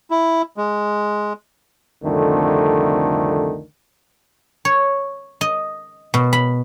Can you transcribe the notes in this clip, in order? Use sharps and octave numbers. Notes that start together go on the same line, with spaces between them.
E4
G#3
C2 F2 D3 D#3 A3
C#5
D#5
B2
B5